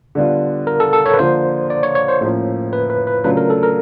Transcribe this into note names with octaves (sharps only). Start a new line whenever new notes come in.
D3 G3 B3 D4 F4
A#4
A4
A4
C#5
B4
D3 F3 A#3 D4 F4 C5
D5
C#5
C#5
C5
A2 F3 A#3 C#4
B4
B4
B4
C#3 F#3 A3 D4 F4 B4
A#4
A4
A#4